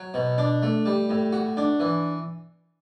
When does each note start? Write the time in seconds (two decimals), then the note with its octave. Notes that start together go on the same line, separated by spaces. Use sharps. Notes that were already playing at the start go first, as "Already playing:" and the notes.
Already playing: F#3
0.14 B2
0.38 D4
0.62 A3
0.86 G3
1.09 A2
1.33 F#4
1.57 D4
1.80 E3